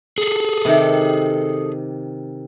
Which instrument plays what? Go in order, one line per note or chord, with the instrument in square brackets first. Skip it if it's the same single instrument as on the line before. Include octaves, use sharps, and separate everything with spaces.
[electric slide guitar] G#4 A4
[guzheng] C3 D#3